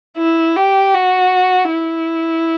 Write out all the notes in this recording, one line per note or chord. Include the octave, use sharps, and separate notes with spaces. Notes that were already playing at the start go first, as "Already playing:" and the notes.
E4
G4
F#4
E4